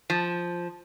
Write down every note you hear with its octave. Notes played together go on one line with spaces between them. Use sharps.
F3